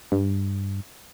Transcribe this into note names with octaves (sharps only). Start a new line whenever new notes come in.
G2